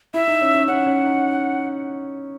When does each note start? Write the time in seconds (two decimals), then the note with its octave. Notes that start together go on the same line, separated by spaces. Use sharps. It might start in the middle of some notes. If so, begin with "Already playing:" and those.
0.14 E4 E5
0.27 D#4
0.41 C#4
0.54 C#4
0.68 C#4 F#5
0.86 C#4
1.04 D#4